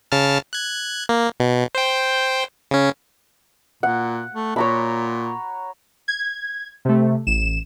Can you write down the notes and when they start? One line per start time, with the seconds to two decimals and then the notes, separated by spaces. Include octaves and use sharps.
0.12 C#3 A5 F6
0.53 F#6 G#6
1.09 A#3
1.40 B2
1.75 C5 G5
2.71 C#3 C#4
3.83 A#2 F#5
4.34 A3
4.56 A#2 C#5 A#5 B5
6.08 G#6
6.85 C3 A3
7.27 A1 E7